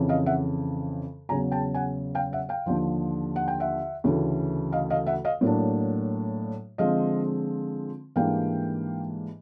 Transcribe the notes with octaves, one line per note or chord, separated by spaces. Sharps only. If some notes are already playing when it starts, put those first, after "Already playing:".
Already playing: F2 C#3 E3
D#5 F5
E5 F#5
E2 C#3 F#3 G#5 A#5
G5 A5
F#5 G#5
F5 G5
E5 F#5
F5 G5
D#2 D3 F3
F#5
G5
E5 F#5
D2 C#3 E3 A3
D#5 F5
D#5 F5
E5 F#5
D#5 F5
A2 F#3 A#3 D4
D3 F3 G#3 C4 D#5 F5
G#2 E3 G3 A#3 D4 F5 G5